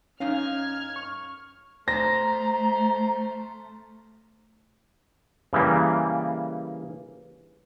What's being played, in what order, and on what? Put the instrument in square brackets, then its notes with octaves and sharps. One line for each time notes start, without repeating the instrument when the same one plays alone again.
[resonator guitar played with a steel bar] F#2 D#4 F5 [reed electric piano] C#4 [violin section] F6 G#6
[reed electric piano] C#6
[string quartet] A3 [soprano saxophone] C5 [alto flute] A#5 [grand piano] A#6
[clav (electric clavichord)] C#3 E3 G3 A#3